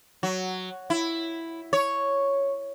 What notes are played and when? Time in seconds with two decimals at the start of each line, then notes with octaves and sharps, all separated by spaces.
0.23 F#3
0.90 E4
1.73 C#5